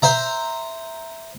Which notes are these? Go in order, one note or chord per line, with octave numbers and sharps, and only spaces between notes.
C5 E5 A#5